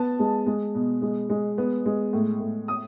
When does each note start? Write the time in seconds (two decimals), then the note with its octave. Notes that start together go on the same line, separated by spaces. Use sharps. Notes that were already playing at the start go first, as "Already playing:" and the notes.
Already playing: B3 A5
0.19 G#3
0.46 G#3
0.75 B2
1.02 G#3
1.29 G#3
1.58 B3
1.86 G#3
2.13 A2
2.40 A2
2.68 D#6